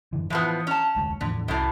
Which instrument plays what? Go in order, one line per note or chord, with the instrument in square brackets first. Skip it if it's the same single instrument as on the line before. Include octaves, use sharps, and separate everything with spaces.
[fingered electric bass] F#2 D3 E3
[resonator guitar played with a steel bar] A2 F3 B3 [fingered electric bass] E3
[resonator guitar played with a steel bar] C#4 A5
[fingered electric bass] F1 D2 G#3
[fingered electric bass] E2 A2 F3 [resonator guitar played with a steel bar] D3
[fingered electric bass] C2 [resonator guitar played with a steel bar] F#2 A2